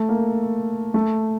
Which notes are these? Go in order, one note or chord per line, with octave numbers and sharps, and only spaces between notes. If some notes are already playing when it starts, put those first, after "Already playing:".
Already playing: A3
A#3
A3